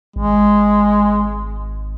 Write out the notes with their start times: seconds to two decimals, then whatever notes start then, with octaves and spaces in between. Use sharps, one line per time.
0.16 G#1 G#3